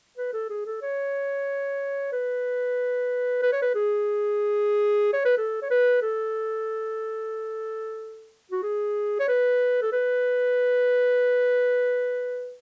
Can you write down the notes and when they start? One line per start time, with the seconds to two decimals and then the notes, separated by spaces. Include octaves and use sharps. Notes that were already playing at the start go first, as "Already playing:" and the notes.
0.18 B4
0.33 A4
0.50 G#4
0.66 A4
0.82 C#5
2.12 B4
3.42 B4
3.52 C#5
3.62 B4
3.75 G#4
5.13 C#5
5.25 B4
5.38 A4
5.62 C#5
5.71 B4
6.02 A4
8.52 F#4
8.63 G#4
9.19 C#5
9.28 B4
9.82 A4
9.92 B4